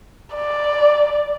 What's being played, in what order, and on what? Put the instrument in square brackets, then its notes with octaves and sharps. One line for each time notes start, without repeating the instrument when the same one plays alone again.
[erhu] D5